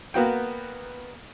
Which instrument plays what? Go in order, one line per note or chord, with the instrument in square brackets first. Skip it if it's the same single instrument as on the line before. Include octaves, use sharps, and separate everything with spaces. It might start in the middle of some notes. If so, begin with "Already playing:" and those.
[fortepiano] A#3 B3 F#4 G5